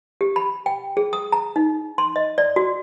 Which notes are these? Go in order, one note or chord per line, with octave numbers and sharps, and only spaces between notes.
G4
B5
G5
G#4
D#6
A#5
D#4
C6
D#5
D5
F#4